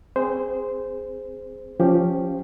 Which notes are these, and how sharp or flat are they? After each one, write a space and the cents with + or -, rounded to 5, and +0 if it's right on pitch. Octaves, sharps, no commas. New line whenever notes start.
C4 +5 G#4 -10 C5 -15
F3 +0 C#4 +0 G4 +0